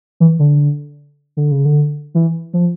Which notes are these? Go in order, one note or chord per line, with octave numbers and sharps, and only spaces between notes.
E3
D3
D3
C#3
D3
E3
F3